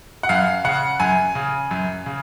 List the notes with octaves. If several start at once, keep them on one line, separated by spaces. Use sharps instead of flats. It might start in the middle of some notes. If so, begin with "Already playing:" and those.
F#5
F#2 F5
C#3 F#5
F#2 G#5
C#3
F#2
C#3